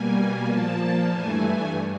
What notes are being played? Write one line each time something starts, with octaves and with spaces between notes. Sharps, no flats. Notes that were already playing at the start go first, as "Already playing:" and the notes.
Already playing: B2 G3 A#3 G#5
A#2 F3 A#3 A5
G2 E3 A3 G#5
G2